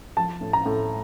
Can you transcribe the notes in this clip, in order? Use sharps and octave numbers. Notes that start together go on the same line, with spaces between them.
F3 A5
A2
A#5
A2